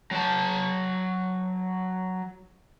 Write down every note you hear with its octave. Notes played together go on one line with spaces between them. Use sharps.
F#3 A5